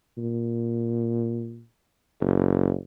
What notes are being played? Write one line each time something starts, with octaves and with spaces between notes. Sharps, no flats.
A#2
F#1